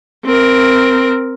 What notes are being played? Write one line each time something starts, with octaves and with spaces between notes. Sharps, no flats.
C4 A#4